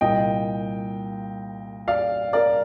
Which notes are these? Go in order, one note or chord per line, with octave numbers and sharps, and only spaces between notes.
C2 A#2 D#5 G5
D5 F5
A#4 D5